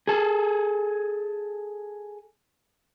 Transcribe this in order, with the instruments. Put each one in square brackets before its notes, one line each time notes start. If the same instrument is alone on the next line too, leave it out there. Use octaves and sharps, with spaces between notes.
[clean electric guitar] G#4 A4